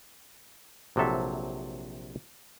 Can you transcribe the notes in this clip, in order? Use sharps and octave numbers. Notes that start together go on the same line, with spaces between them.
A#1 C3 F#3 A4 E5